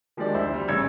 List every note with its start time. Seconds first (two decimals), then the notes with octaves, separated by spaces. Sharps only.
0.17 D#3 F3 G#3 D4 G4 D5
0.34 D2 E4 C5
0.54 G3
0.68 A1 C#3 E6 G#6